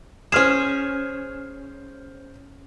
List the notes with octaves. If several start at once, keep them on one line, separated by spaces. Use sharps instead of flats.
C#4 G#4 C5 F6 E7